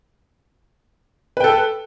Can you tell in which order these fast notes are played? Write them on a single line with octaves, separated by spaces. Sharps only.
B4 G5 A4